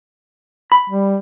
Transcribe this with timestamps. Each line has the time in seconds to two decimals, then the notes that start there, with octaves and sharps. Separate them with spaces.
0.72 B5
0.90 G3